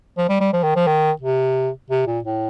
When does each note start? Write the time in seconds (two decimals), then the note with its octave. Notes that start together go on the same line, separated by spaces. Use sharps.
0.17 F3
0.29 G3
0.41 G3
0.53 F3
0.63 D#3
0.76 F3
0.87 D#3
1.21 C3
1.90 C3
2.07 A#2
2.24 A2